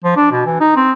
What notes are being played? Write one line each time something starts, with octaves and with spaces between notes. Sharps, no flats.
F3
D4
B2
E3
D#4
C4